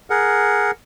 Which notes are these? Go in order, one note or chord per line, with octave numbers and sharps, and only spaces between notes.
G#4 A#4 F#5